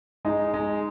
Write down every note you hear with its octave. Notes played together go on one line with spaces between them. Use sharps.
G#3 D#4
G#3